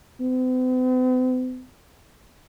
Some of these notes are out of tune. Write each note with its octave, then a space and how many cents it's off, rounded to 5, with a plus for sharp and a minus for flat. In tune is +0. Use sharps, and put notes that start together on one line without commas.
C4 -45